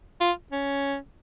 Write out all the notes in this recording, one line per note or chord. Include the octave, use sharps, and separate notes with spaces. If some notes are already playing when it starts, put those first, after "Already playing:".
F4
C#4